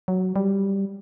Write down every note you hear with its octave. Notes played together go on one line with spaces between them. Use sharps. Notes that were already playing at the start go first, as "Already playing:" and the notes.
F#3
G3